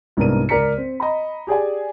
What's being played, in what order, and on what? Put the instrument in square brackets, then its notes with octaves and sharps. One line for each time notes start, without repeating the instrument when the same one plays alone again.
[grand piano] C2 G#2 B3 D4 A#4 D#7
C#2 A#4 D5 A#5 B6 C#7
C4
D#5 A#5 B5
G4 G#4 D5 G#5